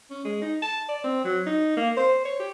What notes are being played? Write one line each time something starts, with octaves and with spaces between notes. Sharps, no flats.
C#4
G#3
D#4
A5
D5
C4
F#3
D#4
A#3
C5
C#5
G4